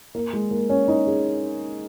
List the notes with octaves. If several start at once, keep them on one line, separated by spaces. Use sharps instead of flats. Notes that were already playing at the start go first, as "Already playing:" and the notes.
A#3
G#3
A#3
C#4
D#4
G#4